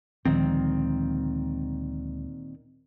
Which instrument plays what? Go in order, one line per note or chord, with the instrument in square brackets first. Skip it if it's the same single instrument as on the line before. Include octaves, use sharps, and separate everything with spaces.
[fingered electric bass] D2 F3 G#3 [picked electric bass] A#2 D#3 C4